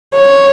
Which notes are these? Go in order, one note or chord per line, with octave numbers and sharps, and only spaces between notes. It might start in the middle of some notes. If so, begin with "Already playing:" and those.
C#5